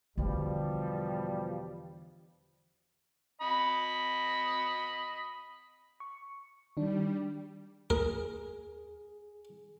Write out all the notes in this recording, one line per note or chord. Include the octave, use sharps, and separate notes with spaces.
E2 B2 D3 F3 G3
D#5 B5
C#6
D#3 G3 D4
D#2 G#4 A#4